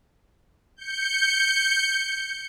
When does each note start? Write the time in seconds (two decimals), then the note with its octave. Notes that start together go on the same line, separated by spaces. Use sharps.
0.77 G6 C#7